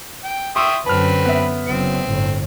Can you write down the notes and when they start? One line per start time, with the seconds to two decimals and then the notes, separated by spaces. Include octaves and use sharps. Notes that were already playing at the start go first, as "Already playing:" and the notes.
0.24 G5
0.56 E5 G5 C6 C#6 D#6 E6
0.86 F#2 D3 C4 B4 A5 F6
1.25 B3 E5
1.68 F#1 F#2 C4
2.06 G1 A2